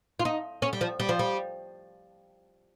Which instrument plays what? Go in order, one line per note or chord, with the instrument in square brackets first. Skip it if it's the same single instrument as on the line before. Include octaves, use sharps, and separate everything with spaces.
[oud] F4
D#4
C#4
G3
F3
G3
F3
G3